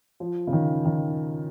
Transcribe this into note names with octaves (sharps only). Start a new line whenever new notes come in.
F3
C#3
D#3
D#3